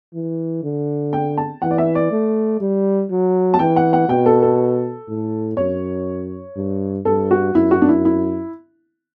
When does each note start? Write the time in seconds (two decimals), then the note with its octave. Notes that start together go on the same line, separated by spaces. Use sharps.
0.14 E3
0.63 D3
1.13 G5
1.38 A5
1.62 E3 F#5
1.71 D5
1.78 E5
1.95 D5
2.12 A3
2.61 G3
3.11 F#3
3.54 A5
3.59 E3 G5
3.76 F#5
3.93 F#5
4.09 B2 G5
4.26 A4
4.42 A4
5.08 A2
5.57 F#2 C#5
6.56 G2
7.05 G2 A4
7.31 F#4
7.55 F#2 E4
7.71 F#4
7.82 D4
7.89 E4
8.05 E4